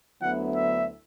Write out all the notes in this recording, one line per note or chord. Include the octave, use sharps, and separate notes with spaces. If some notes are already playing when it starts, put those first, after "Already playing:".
D2 D3 F#3 B3 E4 F#5
E5